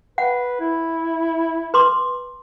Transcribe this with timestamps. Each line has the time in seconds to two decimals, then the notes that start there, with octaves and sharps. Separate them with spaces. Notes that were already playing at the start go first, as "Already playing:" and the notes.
0.18 B4 F#5
0.60 E4
1.74 B4 C6 D6